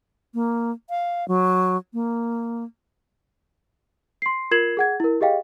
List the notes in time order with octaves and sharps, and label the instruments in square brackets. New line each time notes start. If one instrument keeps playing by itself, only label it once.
[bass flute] A#3
F5
F#3
A#3
[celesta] C6 C7
F4 A#4 G#6 C7 E7 F#7
G#4 F#5 G#6
E4 A#4
G4 G#4 D#5 F5 G5